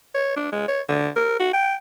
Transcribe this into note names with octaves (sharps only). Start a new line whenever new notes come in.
C#5
D4
G#3
C#5
D3
A#4
F#4
G5